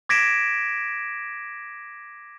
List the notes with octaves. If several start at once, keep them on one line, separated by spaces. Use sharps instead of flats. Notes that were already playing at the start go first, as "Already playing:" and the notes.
D6 G#6 A#6 B6 D7 E7